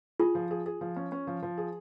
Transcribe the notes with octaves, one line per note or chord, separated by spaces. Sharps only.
F4 G#4
F3
G#4
G#4
F3
C#4
C#4
F3
F3
G#4